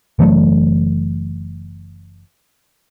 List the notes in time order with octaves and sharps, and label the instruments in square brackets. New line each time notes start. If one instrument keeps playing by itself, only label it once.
[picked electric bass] F#1 E3 F#3 A3